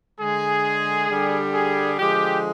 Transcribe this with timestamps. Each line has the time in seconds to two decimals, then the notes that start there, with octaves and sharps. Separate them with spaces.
0.20 D3 G#3 G#4
1.09 D3 G3
1.54 G#4
1.98 D3 F3 G#3 G4